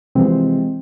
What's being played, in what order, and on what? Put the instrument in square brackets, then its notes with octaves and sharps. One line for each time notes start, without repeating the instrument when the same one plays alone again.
[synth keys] C3 E3 F3 G#3 C4